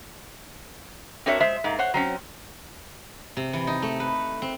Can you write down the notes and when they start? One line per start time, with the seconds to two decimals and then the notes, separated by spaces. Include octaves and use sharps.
1.26 C4 D4 F#4 A#4 C#5 E5
1.40 G#3 C5 E5
1.64 G#2 A#3
1.79 C5 C#5 F#5
1.94 F#3 C4 C#4
3.37 C3
3.53 E3
3.67 D#4
3.82 A3
4.00 B4
4.42 C4